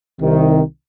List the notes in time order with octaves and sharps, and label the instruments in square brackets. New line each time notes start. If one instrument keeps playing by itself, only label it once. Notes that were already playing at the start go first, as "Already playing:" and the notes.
[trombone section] C2 C3 D#3